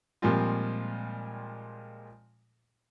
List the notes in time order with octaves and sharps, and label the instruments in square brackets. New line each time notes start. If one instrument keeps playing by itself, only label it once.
[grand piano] A#2 F3 G3 G#3 C4 F4